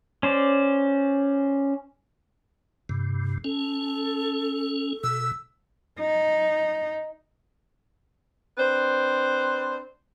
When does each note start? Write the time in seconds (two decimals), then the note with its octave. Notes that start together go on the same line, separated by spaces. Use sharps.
0.23 C#4 C5 D5
2.89 G2 C3
3.44 C#4 A4
5.04 B2 E6
6.00 D#4
8.58 C4 D4 B4 C5